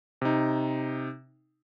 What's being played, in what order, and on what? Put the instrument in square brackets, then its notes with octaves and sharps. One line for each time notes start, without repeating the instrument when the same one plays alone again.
[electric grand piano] C3 D#4